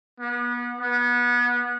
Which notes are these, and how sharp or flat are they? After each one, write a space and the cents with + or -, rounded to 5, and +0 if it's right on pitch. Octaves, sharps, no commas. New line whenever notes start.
B3 -30
B3 -30